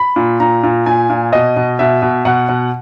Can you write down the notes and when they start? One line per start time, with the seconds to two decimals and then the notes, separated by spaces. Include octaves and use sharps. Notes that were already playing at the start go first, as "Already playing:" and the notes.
Already playing: B5
0.16 A#2
0.40 A#2 A#5
0.63 A#2
0.86 A#2 G#5
1.10 A#2
1.33 B2 D#5
1.56 B2
1.79 B2 E5
2.02 B2
2.25 B2 F#5
2.49 B2